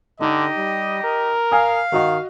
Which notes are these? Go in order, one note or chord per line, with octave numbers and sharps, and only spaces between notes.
D3 D#4 G4 D#5
G3
A#4
F5 G#5 D#6
D#3 F#4 D#5 F#5